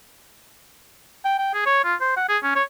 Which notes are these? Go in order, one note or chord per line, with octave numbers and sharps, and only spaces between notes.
G5
G5
G#4
C#5
F4
C5
F#5
G#4
C#4
C#5